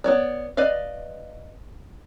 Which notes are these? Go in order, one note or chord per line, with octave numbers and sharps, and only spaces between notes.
B3 C#5 D5
B4 D5 D#5 F5